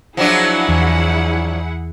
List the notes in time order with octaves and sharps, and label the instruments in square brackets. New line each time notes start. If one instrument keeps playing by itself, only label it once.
[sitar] F3 F#3 D4 [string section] E4 G#4 F#5
[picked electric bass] E2